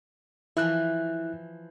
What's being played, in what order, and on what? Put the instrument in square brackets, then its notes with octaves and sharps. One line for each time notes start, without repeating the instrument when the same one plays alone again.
[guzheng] E3 F3 [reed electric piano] E4 F#6